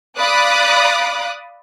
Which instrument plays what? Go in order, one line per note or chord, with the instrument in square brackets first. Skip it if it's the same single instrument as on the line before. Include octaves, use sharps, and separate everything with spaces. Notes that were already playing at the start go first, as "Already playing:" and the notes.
[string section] D5 F5 B5 D6 D#6 F#6